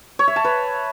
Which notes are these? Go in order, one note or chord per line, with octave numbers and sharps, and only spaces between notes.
C#5
E5
A5
B4